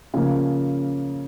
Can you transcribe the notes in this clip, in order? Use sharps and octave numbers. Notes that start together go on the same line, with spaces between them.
C#3 F3 A#3